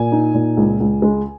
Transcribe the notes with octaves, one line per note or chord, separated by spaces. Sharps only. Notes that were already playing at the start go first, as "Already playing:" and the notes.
Already playing: A#2 G#5
D#4
A#2
C#2
C#2
G#3